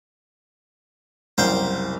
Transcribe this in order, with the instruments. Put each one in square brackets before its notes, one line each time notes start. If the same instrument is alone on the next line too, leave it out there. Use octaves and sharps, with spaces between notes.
[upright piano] F#1 C2 [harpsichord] C5 F5 G5